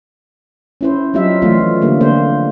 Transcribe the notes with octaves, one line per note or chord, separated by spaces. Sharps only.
C#4 E4 C5
F#3 G3 C4 D#4 F4 E5
E3 F3 A3 C4 F4
D3 G3 A#3
D3 A#3 C4 C5